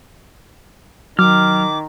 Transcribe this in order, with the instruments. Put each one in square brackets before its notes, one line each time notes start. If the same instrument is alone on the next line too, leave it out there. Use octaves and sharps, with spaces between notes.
[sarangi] D#3 [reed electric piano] F#3 [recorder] D6 [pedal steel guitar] F6